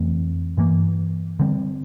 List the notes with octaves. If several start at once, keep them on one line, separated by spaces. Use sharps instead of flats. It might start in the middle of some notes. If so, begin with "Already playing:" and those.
Already playing: F2 E3 A3 C4
G2 E3 A#3
D3 G3 C4